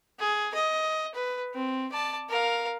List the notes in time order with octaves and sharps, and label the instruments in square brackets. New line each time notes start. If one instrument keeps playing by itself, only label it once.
[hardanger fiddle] G#4
D#5
B4
C4
D5 A5
A#4 F5